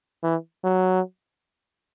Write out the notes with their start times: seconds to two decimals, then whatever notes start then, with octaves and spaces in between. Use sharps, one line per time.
0.23 E3
0.64 F#3